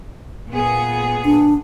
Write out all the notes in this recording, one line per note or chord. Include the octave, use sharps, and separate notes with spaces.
A#2 B3 G#4
D4